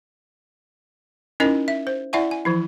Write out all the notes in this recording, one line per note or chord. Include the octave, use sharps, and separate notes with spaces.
C#4 D#4 E4 A#4 D#5
E5
C5
E4 D5 E5 F#5 G#5 C#6
G#5
E3 F3 E4